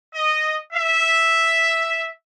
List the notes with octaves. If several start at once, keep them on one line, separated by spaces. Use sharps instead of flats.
D#5
E5